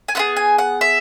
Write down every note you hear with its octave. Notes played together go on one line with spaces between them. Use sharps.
G#5
B3 E4 G#4 F#5
G#5
F#5
E5